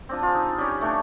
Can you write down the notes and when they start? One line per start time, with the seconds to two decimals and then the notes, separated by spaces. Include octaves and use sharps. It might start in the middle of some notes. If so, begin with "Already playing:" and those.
0.09 C4 D4 F4
0.23 F4 G#4
0.35 D#4
0.58 G3 C#4 G4
0.81 A3 C#4 D4